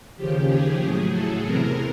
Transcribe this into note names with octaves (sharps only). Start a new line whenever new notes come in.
D#2 C#3 F3 G4
G#4
A2 F#3
A4
E2 C3 E3 A#4